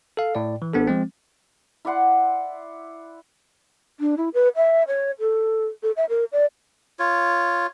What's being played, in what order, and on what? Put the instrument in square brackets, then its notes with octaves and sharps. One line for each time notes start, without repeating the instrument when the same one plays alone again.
[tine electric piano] A4 F5
A2 D5
E3
A1 B3 D4 A4
F3 G#3 C4
[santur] E4 D5 F#5 C6
[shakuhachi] D4
E4
B4
E5
C#5
A4
A4
E5
A#4
D5
[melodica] F4 C#5